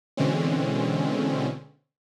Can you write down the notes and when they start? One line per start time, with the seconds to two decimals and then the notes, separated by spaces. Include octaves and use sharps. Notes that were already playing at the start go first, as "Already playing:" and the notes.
0.17 B2 D3 E3 G#3 C4 C#4